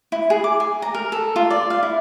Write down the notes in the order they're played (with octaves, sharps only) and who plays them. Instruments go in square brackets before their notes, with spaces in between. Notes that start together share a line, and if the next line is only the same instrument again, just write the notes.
[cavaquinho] E4
G#4
D6
G#5
A#5
A#4
A4
F4
D5
F5
E4